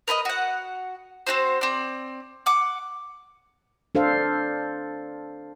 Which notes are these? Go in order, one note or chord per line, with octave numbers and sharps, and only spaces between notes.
A#4 B4 D5 D#5
F#4 F#5
C4 C#4 F#4 C5
C4 D5
F#5 D6
D4 A4 C5 F5